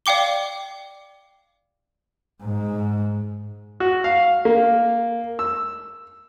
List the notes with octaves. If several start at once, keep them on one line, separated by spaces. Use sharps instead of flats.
D5 F5 G5 D6 G7
G#2
F#4
F5
A#3
E6